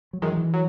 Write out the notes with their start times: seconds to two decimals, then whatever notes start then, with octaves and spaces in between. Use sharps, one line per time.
0.13 F#3
0.22 F#2 D#3 E3 G#3
0.37 E3
0.54 F#3